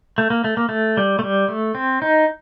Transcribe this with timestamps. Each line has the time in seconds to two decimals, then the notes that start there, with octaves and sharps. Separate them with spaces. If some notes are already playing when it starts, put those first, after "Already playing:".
0.18 A3
0.30 A#3
0.44 A3
0.57 A#3
0.69 A3
0.97 G3
1.19 A3
1.23 G3
1.48 A3
1.75 C4
2.02 D#4